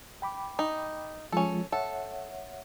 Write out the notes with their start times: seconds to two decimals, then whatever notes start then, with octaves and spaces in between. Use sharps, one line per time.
0.22 G5 B5 D6
0.59 D#4
1.32 F3 G#3 C#4 F4 A4
1.72 A4 C#5 E5 F#5